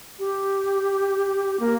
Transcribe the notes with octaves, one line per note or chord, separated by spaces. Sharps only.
G4
A#3